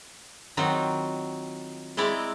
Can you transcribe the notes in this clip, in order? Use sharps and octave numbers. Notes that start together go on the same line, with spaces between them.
D#3 F#3 C4 D#4 F4 F#4
G#3 C4 E4 D5 A#5